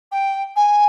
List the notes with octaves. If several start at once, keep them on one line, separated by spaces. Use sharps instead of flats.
G5
G#5